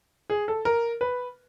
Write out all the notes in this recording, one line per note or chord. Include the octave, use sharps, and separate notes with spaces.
G#4
A4
A#4
B4